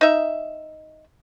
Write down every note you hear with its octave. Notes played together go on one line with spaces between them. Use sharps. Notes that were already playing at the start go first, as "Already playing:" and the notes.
D#4 E5